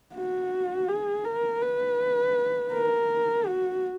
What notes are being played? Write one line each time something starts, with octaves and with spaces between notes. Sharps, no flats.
F#4
G#4
A#4
B4
A#4
F#4